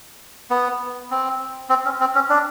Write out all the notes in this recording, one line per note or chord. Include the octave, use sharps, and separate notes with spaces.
B3
C4
C4
C#4
C4
C#4
D4